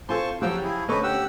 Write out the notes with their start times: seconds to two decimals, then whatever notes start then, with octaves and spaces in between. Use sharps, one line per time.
0.09 C4 F4 A4 C5 G#5 A5 C6 C#6
0.42 C#3 F3 F#3 G4 F#5 G5 E6
0.63 E4 G#4
0.88 D2 B3 C#4 A4 B4 D#5 C#6
1.03 G4 F#5 E6